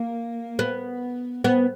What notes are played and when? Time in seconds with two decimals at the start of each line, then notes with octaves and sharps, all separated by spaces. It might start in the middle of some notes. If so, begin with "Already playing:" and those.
Already playing: A#3
0.59 B3
1.44 B3